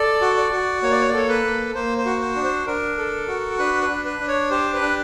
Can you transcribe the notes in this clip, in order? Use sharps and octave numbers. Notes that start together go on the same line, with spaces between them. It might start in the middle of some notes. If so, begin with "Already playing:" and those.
Already playing: A4 D5
F#4
D5
F#4
A#3 C#5
D5
C#5
D5
A4 C#5
B4
A#3
A#3 C5
C5
F#4
C5
D4
C5
D4 A#4
A4
F#4
D4 B4
B4
D4
B4
D4
C#5
G4 C5
B4
D4